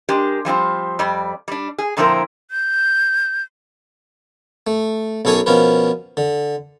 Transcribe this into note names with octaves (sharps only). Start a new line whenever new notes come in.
G#3 D4 G4 A#4
F3 G3 C4 F4
F2 G3 D5
G3 D4
G#4
A#2 D3 F3 C4 E4 A#4
G6
A3
B1 F#2 A4 C#5 G#5 A#5
B2 F3 C#4 A#4 B4
D3